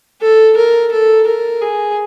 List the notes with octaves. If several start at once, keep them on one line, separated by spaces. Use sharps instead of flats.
A4
A#4
A4
A#4
G#4